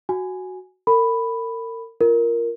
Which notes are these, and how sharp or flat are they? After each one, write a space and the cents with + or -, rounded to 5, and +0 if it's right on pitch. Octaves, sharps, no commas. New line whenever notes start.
F#4 +0 G#5 +0
A#4 -35 B5 +0
F4 -15 A#4 +0